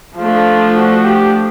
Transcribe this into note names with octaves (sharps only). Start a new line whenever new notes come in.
F3 A3 D4 F4
F#4
G4